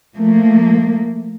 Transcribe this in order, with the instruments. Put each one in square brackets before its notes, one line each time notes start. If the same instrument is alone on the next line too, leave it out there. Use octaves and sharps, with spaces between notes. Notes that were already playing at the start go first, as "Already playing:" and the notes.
[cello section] F3 A3 A#3